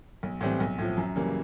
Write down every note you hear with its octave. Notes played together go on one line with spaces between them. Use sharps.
B1
A2 E3 G3 C4
B1
A2 F3
F#2
C#3 E3 G3 A#3